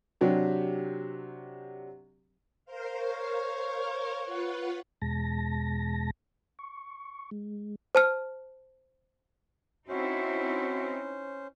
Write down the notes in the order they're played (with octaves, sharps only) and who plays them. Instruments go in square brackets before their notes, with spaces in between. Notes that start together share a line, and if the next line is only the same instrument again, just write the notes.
[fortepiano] C3 F#3 D4 G4
[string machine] A#4 C5 F5
[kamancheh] C#5
[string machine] F4 B4 F#5
[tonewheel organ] E2 B2 G#3 A5 A#6
C#6
G#3
[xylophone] C5 A5 F6
[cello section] C4 D#4 E4 [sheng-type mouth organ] C#4 C5 [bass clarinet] F#4